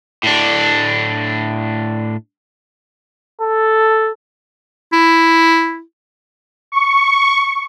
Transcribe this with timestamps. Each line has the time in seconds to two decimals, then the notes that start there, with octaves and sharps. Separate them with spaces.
0.23 A2 D4
3.42 A4
4.92 E4
6.72 C#6